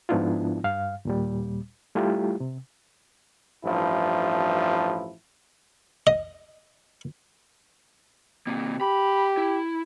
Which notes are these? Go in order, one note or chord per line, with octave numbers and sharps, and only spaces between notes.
G#2 F3 B3 D4 E4 F4
G2 F5
D#2 A#2 G3
G3 A3 E4 F4 G4
C3
A1 G2 F3 E4
D#5
C3 A#3
G4 B5
E4